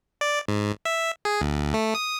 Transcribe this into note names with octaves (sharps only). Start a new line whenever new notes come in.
D5
G#2
E5
G#4
D2
A3
D#6